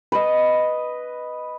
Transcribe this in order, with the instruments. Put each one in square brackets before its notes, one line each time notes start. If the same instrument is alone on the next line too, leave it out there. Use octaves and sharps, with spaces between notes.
[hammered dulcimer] B4 D#5